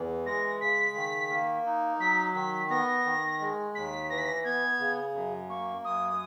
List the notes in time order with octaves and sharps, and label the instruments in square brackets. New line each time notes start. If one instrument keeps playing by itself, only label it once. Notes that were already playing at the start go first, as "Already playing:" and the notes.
Already playing: [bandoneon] E2 E3
[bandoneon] G#3 [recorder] A#6
[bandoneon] C#3 [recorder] B6
[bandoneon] D#3
A#3
D#4
[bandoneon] F#3 [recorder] B6
[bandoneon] D#3 [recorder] B6
[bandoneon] B3 [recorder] A#6
[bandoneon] D#3
G#3
[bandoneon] D#2 [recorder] B6
[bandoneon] E3 [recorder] A#6
[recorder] B6
A#6
[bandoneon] B3 [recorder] G#6
[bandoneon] C#3
F#2
[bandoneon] A#3 [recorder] C#6
[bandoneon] F#2 [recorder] D#6